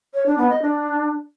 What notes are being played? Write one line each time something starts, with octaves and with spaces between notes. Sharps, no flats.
C#5
D4
B3
D#5
D4